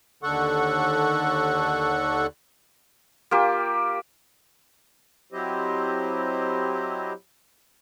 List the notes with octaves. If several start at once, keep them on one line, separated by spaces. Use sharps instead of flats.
D#2 D3 A4 F#5 C#6
A#3 F4 G4
F#3 C4 E4 G4 C5 D#5